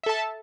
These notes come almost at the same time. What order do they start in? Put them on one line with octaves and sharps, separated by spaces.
E5 A4 A5